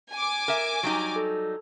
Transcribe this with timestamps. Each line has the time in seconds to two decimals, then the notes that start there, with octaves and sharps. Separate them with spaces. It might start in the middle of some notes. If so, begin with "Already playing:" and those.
0.12 G#5 D6
0.48 A#4 E5
0.83 F#3 G3 D#4
1.16 A4